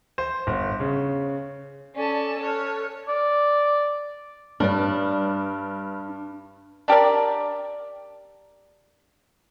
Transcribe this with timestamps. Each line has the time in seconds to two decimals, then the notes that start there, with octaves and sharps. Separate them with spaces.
0.18 C5
0.47 G1
0.80 C#3
1.95 C#4 A4 D5 G#5 A5
2.42 A4 C#5 F6 F#6
3.08 D5
4.60 G2 D4 D5
6.88 D4 G4 A#4 D5